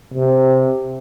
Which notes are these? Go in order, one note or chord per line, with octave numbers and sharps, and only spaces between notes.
C3